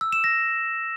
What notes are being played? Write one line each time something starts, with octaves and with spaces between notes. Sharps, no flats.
E6
E7
A#6